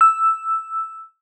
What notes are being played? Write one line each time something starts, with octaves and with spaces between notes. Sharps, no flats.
E6